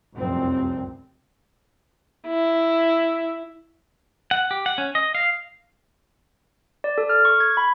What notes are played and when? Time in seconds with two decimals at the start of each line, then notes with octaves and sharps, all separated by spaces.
0.16 F1 C2 F#2 C4
2.28 E4
4.31 F#5
4.51 G4
4.66 F#5
4.78 C#4
4.95 D#5
5.15 F5
6.84 D5
6.98 A4
7.09 F6
7.25 C#6
7.40 G#6
7.57 B5